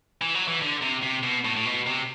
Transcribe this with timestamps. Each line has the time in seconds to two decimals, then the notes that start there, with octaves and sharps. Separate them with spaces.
0.22 E3
0.35 F#3
0.48 E3
0.62 D3
0.83 C3
1.03 C3
1.24 B2
1.45 A2
1.56 A2
1.66 B2
1.86 C3